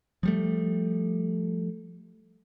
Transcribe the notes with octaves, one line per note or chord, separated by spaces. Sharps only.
F3 G3 A3